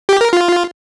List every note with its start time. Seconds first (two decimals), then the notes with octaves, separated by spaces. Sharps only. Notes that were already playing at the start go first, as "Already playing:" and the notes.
0.09 G4
0.21 A#4
0.33 F4